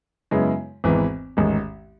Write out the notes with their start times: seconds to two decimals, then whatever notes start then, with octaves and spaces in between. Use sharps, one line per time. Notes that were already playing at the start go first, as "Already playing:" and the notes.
0.31 F#2 C#3 G#3 B3 E4
0.84 G#1 G#2 E3 B3
1.37 A1 G#2 D#3 G#3